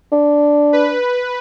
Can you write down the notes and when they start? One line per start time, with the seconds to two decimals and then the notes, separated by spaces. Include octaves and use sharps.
0.12 D4
0.73 B4